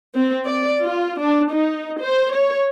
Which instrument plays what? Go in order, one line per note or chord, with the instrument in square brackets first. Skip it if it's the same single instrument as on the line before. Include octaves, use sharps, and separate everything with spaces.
[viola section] C4
D5
F4
D4
D#4
C5
C#5